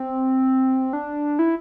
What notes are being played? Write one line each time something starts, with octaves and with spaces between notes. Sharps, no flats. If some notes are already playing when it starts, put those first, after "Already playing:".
Already playing: C4
D4
E4